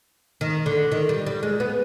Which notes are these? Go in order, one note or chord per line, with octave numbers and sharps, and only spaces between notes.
D#3
D3
D#3
G3
G3
G#3
B3